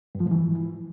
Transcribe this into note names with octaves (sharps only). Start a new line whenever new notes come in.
G2
F3
G#2
E3